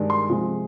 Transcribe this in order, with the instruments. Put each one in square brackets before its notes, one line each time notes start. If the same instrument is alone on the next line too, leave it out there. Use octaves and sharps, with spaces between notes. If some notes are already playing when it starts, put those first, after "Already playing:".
Already playing: [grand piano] G2 D#3 G#3
C6
C3 F3 G#3